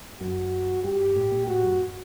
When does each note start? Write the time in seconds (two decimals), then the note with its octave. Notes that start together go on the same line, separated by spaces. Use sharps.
0.20 F#2 F#4
0.84 G2 G4
1.16 A2
1.32 A#2
1.47 A2 F#4
1.63 F#2